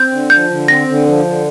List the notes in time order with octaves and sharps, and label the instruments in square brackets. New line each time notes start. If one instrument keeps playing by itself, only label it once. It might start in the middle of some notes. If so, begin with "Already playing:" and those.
Already playing: [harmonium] C4 [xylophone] G6
[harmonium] D3
[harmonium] F3 [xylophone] G6
[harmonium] D3
[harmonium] C4 [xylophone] A#6
[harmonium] D3
F3
D3